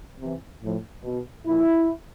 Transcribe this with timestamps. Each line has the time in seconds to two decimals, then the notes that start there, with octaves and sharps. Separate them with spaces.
0.19 C3 E3
0.62 A2 F3
1.04 B2
1.46 A#2 F3 E4